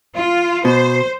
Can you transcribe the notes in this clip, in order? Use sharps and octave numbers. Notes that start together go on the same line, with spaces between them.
F4
B2 C5